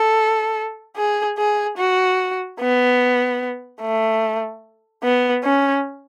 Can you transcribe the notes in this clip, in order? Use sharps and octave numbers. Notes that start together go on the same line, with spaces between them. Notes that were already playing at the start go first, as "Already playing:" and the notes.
Already playing: A4
G#4
G#4
F#4
B3
A3
B3
C#4